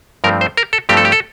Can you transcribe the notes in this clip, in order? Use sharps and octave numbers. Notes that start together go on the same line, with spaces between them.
G2 F3 A3 C4 A#4
C5
A#4
A4
G2 F3 A3 C4 G4
A4
G4
A4